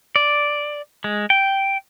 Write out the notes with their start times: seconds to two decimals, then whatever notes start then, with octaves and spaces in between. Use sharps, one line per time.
0.16 D5
1.04 G#3
1.30 G5